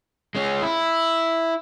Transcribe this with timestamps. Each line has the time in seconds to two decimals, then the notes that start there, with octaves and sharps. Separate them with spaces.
0.35 G#3 C#4
0.62 E4